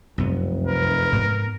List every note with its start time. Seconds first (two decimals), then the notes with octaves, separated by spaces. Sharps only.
0.18 F1 C2 F#2 B3
0.67 A#4 B4
1.13 G#2 B3